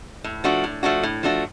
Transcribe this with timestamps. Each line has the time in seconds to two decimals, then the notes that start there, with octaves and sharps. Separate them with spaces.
0.24 A2
0.44 F3 A3 D4 F#4
0.64 A2
0.83 F3 A3 D4 F#4
1.03 A2
1.23 F3 A3 D4 F#4